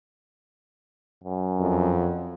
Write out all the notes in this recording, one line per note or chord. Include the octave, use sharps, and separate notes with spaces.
F#2
F2